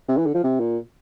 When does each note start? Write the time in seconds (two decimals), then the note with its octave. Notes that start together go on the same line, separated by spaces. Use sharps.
0.09 C3
0.18 E3
0.26 D3
0.35 F3
0.44 C3
0.60 A#2